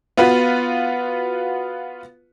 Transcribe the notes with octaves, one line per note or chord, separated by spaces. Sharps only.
B3 F4 F#4 B4